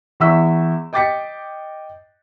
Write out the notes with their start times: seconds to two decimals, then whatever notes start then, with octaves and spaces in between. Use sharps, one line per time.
0.20 E2 E5 C#6 E6 B6
0.93 D#5 G5 D6 A6 B6 C#7